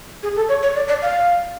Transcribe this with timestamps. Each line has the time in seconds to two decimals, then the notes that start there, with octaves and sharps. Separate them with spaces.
0.23 G#4
0.36 A4
0.49 C#5
0.63 C#5
0.75 D5
0.88 D5
1.02 F5